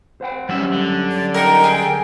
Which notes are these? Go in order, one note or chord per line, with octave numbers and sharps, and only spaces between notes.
C5 F#5 G5
G2 F#3 G3 C#4 E5
D3
D5
D#4 A#4 G5
G#4